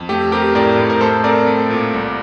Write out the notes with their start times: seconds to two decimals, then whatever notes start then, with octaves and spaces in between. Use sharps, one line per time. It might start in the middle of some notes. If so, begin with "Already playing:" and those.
Already playing: F2
0.09 A3 G4
0.32 C4 G4 A#4
0.55 A2 A#4 D5
0.78 A2
0.90 A#4
1.01 A3 A4 C5
1.24 C4 A#4 D5
1.47 A3
1.70 A#2
1.93 C2